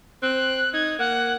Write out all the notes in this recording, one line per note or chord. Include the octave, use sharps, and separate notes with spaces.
C4 F#6
D#4 G#6
A#3 F#5